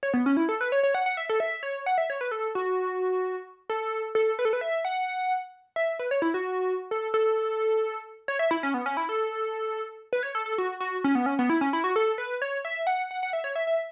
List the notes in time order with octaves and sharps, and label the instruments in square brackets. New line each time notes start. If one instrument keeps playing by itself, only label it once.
[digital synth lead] C#5
B3
C#4
E4
A4
B4
C#5
C#5
F#5
F#5
E5
A4
E5
C#5
F#5
E5
C#5
B4
A4
F#4
A4
A4
B4
A4
B4
E5
F#5
E5
B4
C#5
E4
F#4
A4
A4
C#5
E5
E4
C#4
B3
C#4
E4
A4
B4
C#5
A4
A4
F#4
F#4
C#4
B3
C#4
B3
E4
C#4
E4
F#4
A4
B4
C#5
E5
F#5
F#5
F#5
E5
C#5
E5
E5